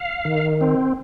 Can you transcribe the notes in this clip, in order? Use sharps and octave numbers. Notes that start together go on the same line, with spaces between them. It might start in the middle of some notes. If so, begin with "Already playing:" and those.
Already playing: F5
D#3
C4